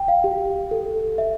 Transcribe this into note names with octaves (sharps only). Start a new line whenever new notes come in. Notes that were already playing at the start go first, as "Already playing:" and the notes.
Already playing: G5
F5
G4
A4
E5